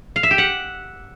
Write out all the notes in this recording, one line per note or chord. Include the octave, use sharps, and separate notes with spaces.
F5
E5
G4
F#5